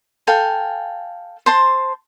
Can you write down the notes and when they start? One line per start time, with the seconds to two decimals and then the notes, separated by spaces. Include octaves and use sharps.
0.27 A4 F5 G5 G#5
1.46 C5 A5 C6